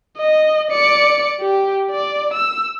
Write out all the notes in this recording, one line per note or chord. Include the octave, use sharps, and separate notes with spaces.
D#5
D5 C#7
G4
D5
E6